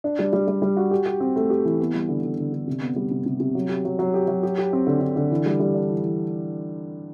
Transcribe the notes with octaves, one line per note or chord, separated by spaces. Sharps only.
D4
G3
G3
G3
G3
F#4
G4
G4
C4
A3
G4
E3
B3
G3
D3
D3
D3
D3
C3
B3
G3
C3
C3
C3
F#3
G4
F#3
F#3
G4
F#3
G4
G4
C4
D3
D3
D3
E3
G3
G3
D4
E3
E3